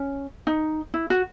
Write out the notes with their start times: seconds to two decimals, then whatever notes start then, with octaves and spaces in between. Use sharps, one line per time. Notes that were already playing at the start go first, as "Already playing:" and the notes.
Already playing: C#4
0.47 D#4
0.94 E4
1.10 F#4